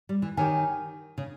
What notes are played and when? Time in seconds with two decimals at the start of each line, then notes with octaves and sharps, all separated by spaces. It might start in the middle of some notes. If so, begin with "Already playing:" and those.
0.09 G3
0.22 E3
0.37 D#3 G4 C#5 G#5
1.18 C#3